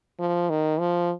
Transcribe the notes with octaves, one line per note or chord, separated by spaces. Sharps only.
F3
D#3
F3